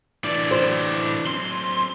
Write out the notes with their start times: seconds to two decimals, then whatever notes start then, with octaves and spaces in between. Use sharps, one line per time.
0.24 A2 E3 D4 D5
0.51 C5
1.27 F#3 C4 C6